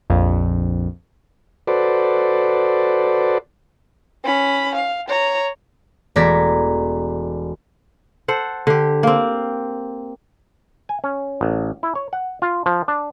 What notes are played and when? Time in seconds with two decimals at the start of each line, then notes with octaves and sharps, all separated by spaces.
0.10 A#1 F2
1.67 F#4 A4 B4 C5 D5
4.24 C#4 B5
4.76 F5
5.09 C#5 A#5
6.16 E1 A3 D5 A#5 G#6 B6
8.28 A4 C5 F#5
8.67 D3 G4
9.03 A#3 C4
10.89 G#5
11.04 C#4
11.41 A1
11.83 E4
11.95 C#5
12.13 F#5
12.42 F4
12.66 F3
12.88 D4